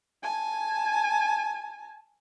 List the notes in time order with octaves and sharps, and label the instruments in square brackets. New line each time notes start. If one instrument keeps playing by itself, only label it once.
[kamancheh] G#5 A5